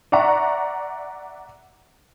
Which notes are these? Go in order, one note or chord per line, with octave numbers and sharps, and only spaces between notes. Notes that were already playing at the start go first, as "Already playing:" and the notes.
D5 E5 F#5 A#5 C#6